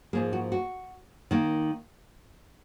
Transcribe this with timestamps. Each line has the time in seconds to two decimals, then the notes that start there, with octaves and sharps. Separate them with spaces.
0.13 G#2 F3 A#3 G#4
0.33 F#4
0.52 F#4
1.31 D#3 A#3